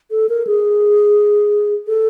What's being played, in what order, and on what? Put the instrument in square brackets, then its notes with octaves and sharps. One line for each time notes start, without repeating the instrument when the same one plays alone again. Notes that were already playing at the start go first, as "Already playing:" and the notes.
[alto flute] A4
A#4
G#4
A4